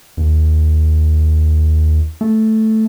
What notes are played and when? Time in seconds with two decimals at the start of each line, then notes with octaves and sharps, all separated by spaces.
0.17 D#2
2.21 A3